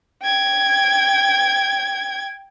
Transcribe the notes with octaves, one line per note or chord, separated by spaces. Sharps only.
G5 G#6